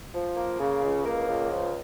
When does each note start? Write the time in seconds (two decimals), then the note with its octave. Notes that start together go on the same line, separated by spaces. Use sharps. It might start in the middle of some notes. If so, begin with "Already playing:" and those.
0.13 F3
0.36 A#3
0.59 C#3
0.82 C#2
1.05 A#3
1.29 C#2
1.51 F3